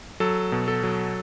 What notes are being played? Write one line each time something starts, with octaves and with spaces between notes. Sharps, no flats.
F#3 A4
B2
A4
F#3